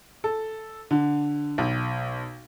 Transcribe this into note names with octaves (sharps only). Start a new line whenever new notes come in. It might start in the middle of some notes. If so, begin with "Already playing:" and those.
A4
D3
B1